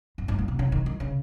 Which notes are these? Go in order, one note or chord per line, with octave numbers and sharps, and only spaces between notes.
G2
G#2
A#2
C3
C#3
D#3
D#3
C#3